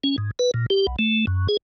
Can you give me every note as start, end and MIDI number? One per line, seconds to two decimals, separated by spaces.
0.04 0.16 61
0.18 0.31 44
0.39 0.51 71
0.54 0.66 46
0.70 0.87 67
0.87 0.96 35
0.99 1.25 57
1.27 1.47 42
1.49 1.57 68